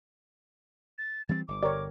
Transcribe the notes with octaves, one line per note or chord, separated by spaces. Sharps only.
A6
E3 G3 C4 A6
G1 D6
G1 D3 G4 A#4 C#5 D5